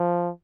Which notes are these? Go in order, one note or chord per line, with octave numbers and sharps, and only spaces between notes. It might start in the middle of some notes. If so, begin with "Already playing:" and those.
Already playing: F3